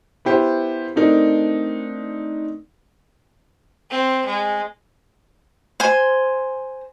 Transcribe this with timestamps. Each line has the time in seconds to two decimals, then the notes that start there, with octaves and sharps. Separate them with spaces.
0.25 B3 E4 G4 C5
0.96 A3 C4 D4 D#4 A#4
3.90 C4
4.25 G#3
5.80 C5 G#5